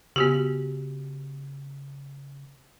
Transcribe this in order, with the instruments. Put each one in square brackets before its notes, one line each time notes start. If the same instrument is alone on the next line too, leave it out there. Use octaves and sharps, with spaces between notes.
[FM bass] C#3 [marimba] B3 F#4 G4